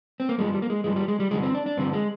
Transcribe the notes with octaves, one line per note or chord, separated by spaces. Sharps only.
C4
A#3
G2 F3 G#3
G3
A#3
G#3
G2 F3 G#3
G3
G#3
G3
G2 D3 F3 G#3
C4
D4
D4
G2 D3 F3 C4
G#3